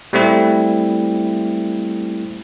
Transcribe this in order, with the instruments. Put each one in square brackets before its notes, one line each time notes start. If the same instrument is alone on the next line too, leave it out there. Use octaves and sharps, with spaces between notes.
[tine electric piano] G3 A3 C4 E4